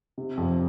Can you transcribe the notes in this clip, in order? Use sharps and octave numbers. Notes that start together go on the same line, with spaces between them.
C3
F2